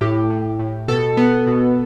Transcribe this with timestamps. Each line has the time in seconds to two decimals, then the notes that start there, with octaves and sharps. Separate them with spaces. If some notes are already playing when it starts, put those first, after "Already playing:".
0.01 A2 G4
0.30 A2
0.59 A2
0.88 B2 A4
1.17 B3
1.47 B2